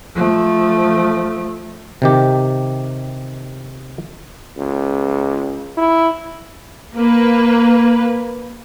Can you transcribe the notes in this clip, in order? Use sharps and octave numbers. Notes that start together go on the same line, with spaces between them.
F3 A3
C3 D#3 G4
C#2
E4
A#3 B4